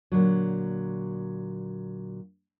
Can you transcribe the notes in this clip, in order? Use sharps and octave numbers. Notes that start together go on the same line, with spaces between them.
A#2 D3 F#3